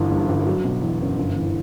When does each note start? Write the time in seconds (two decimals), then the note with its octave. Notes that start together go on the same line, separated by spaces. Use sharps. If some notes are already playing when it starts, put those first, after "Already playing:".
Already playing: G1 F#2 E3
0.10 G2
0.28 G1
0.47 F#3
0.64 B2
0.82 E2
1.00 F#1
1.18 G1
1.36 E3